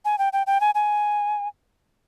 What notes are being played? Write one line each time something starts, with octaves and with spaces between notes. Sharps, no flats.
G#5
G5
G5
G5
G#5
G#5